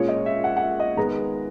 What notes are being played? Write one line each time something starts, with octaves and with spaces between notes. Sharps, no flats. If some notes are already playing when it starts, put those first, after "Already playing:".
Already playing: A#2 G#3 C#4 C#5
D#5
E5
F#5
F#5
E5
D#5
D#3 G#3 B3 A#5